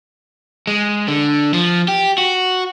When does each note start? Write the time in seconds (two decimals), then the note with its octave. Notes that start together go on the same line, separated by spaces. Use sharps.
0.67 G#3
1.08 D3
1.54 F3
1.88 G4
2.18 F#4